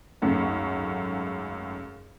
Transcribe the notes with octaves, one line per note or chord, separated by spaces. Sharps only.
G#1 C#2 F#2 A3 C#4 F#5